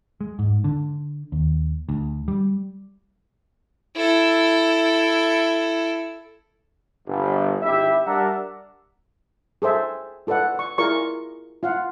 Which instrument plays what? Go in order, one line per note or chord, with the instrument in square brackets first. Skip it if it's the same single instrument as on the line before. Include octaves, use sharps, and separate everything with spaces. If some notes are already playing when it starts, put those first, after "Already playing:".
[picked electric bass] G#3
G#2
D3
D#2
D2
G3
[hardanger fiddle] E4 A4
[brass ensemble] G1
G#1 E4 G4 E5
G3 D4 A#4 E5 F#5 A#5
[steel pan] G#4 A4 C5 E5 G#5
F4 A4 B4 D5 F#5
D5 C#6
E4 F4 G#4 A#4 D5 C#6
F4 F5 F#5